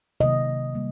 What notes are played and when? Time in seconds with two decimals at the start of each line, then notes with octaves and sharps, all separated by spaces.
0.20 C3 D#3 F#3 A#3 D#5
0.75 G3 A#3